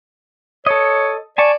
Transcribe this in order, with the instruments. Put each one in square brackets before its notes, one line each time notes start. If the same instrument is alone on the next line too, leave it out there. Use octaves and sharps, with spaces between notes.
[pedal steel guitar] A4 D#5 [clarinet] C#5
[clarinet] D5 [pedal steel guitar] G#5 A5 C#6